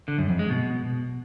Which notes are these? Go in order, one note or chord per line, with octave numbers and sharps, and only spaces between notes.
D3
F#2
F2
G#3
B2